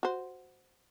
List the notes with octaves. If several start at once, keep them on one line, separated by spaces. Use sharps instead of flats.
F#4 C5